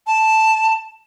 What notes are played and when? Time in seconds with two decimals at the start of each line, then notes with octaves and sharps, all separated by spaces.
0.07 A5